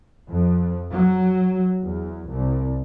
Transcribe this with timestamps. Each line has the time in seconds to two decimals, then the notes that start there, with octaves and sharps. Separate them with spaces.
0.28 F2
0.91 F#3
1.81 E2
2.28 C2